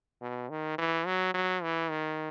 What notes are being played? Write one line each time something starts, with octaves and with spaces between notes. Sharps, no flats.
B2
D#3
E3
F#3
F#3
E3
D#3